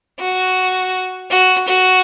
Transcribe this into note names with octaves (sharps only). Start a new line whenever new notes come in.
F#4
F#4
F#4